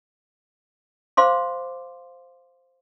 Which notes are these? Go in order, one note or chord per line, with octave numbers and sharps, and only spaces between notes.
C5 F5 C6 D6